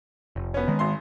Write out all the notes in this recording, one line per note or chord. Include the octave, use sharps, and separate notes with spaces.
F1
B3 C#4
D#3 G#3
G#1 C6